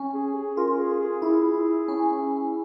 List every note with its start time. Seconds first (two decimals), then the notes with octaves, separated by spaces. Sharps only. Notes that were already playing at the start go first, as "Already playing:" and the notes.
Already playing: C#4
0.14 G#4
0.35 G#4
0.57 F4 A#4
0.80 G#4
1.00 G#4
1.22 E4
1.88 C#4